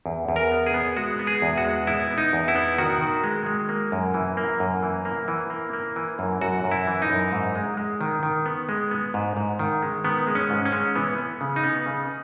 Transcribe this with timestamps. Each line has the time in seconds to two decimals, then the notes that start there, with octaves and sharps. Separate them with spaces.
0.06 E2
0.29 E2
0.36 A#4
0.52 B3
0.66 G#4
0.74 B3
0.97 G#3 F#4
1.19 B3
1.27 G#4
1.42 E2
1.58 F#4
1.65 G#3
1.87 B3 E4
2.10 B3
2.18 D#4
2.33 E2
2.48 E4
2.55 B3
2.78 D#3 F#4
3.01 D#3
3.24 G#3
3.46 G#3
3.69 A#3
3.92 F#2
4.14 E3
4.37 A#3
4.60 F#2
4.83 E3
5.05 A#3
5.28 E3
5.50 A#3
5.73 A#3
5.96 E3
6.19 F#2
6.41 F#2 F#4
6.64 F#2
6.71 E4
6.87 E3
7.02 D#4
7.10 F#2
7.32 G#2
7.55 G#3
7.77 G#3
8.01 D#3
8.23 D#3
8.46 B3
8.69 G#3
8.91 B3
9.14 G#2
9.37 G#2
9.59 D#3
9.82 G#3
10.04 D#3 B3
10.27 G#3
10.35 C#4
10.50 G#2
10.65 C#4
10.72 G#3
10.95 E3 B3
11.18 B3
11.41 C#3
11.56 D#4
11.64 B3
11.86 C#3